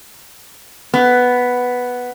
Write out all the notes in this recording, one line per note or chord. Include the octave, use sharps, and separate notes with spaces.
B3